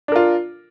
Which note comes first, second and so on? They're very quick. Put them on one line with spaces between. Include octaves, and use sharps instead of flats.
D4 A#4 F4